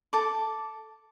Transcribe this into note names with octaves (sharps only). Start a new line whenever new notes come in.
A4 D6